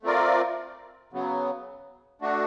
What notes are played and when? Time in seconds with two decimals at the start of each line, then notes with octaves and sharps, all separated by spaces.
0.03 A3 C4 F4 A#4 D5
1.13 C#3 F#3 B3
2.22 A3 D4 F#4